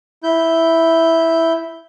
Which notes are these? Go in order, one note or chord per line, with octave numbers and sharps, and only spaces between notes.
E4 G6